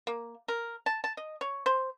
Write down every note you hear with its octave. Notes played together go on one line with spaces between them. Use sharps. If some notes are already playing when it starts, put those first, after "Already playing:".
A#3
A#4
A5
A5
D#5
C#5
C5